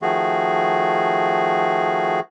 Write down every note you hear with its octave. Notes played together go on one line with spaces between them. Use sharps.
D#3 F3 A3 F#4 G#4